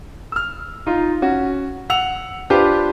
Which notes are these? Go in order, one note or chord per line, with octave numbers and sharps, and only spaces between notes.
E6 F6
D#4 F4
C#4 F#4
F#5 E6 F7
D4 F4 G4 B4 C5